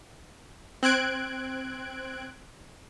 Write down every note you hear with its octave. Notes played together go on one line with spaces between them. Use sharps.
C4 F#6 G#6 D7